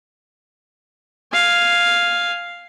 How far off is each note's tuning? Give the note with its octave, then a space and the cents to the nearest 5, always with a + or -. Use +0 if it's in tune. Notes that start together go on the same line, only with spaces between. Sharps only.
F5 +0 G#5 +0